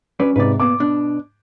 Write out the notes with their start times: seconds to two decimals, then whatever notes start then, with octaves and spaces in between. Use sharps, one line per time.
0.19 F#3 C#4 B4 D5
0.36 G#2 C3 B4 D5
0.60 A#2 B3 D6
0.80 B2 D4